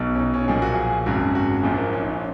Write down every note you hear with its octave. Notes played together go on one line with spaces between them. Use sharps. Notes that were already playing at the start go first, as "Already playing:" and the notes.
Already playing: B1 B2
C#4
D#4
C#4
B1 A#2 F3 G#4
F#4
G#4
G#1 F#2 C#3 F#4
G#4
F#4
A#1 A#2 F3 G#4
A#4
C#4
D#4
C#4